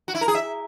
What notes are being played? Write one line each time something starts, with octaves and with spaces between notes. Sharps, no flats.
F#4
E4
A#4
G#4
E5